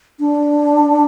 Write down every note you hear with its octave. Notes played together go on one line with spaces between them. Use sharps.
D4